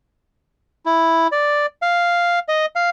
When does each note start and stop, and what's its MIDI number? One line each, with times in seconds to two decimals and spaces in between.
0.86 1.27 64
1.32 1.66 74
1.82 2.39 77
2.48 2.66 75
2.76 2.90 77